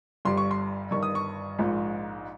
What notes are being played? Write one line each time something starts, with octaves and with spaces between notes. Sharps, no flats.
G1 G2 G3 C6
C#6
C6
G1 G2 D#3 C#6
D#6
C#6
A#1 G#2 F3 G#3